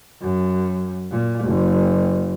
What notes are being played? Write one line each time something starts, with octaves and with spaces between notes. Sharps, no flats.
F#2
A#2
F#1